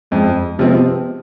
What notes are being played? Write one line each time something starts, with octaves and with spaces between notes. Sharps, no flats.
F2 G#3
C3 F3 G#3 B3 C4